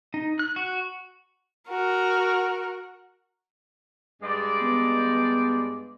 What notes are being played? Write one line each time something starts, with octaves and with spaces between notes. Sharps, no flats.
D#4
F#6
F#4
F#4 A#4
G2 G#3 D5
B3